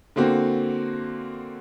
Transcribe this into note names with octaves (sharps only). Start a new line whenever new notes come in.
D3 A#3 C4 F#4